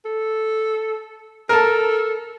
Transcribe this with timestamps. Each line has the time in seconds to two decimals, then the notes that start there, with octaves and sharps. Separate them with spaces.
0.05 A4
1.49 A4 A#4 A5